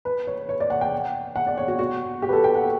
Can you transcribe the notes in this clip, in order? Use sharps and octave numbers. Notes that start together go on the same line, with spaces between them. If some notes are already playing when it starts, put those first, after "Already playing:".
B4
C#5
C#5
D5
F#5
G5
F#5
D5
C#5
F#4
F#4
G4
B4
A4
G5
F#5